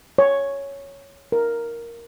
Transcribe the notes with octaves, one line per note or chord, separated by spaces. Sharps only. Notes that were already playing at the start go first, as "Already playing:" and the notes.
C#5
A#4